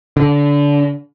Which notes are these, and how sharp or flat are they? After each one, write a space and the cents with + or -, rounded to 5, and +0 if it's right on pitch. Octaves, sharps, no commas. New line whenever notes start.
D3 -25